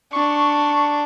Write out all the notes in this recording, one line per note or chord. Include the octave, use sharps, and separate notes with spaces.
D4 C#6